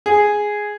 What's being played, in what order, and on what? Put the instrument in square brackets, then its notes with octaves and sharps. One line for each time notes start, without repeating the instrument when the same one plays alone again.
[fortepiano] G#4